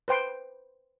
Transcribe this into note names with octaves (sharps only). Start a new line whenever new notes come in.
B4 C5 G5 C6